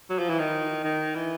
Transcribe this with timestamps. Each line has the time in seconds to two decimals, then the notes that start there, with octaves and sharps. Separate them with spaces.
0.10 F#3
0.19 F3
0.29 E3
0.39 D#3
0.84 D#3
1.15 E3